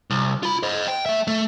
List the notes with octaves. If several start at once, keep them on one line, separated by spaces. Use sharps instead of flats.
C2
F4 B5
C5 D#5
G5
A3 E5
A3